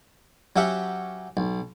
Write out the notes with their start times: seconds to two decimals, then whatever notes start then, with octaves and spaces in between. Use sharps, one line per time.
0.56 F#3 C#4 G4 E5 F#5
1.37 B1